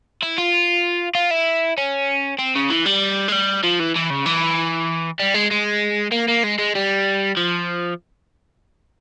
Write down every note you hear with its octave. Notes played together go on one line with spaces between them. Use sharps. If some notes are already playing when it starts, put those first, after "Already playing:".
E4
F4
F4
E4
C#4
C4
C#3
E3
G3
G#3
G3
F3
E3
E3
C#3
E3
G3
G#3
G#3
A#3
A#3
G#3
G#3
G3
F3